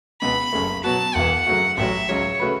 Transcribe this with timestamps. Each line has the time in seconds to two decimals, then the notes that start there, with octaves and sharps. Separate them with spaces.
0.21 C#2 B2 B3 B5
0.53 F#1 F#2 C#3 A3
0.83 B2 F#3 B3 F#4 A5
1.15 E1 E2 E3 F#5
1.47 F#2 C#3 F#3 A3 F#4
1.77 A1 A2 F#3 E5
2.09 C#2 C#3 F#3 C#5
2.40 C#3 A3 F#4 B4